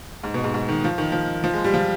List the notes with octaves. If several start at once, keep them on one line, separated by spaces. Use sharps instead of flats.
G#2
B2
G#2
G#2
D#3
F3
D#3
F3
F3
G#3
G3
F3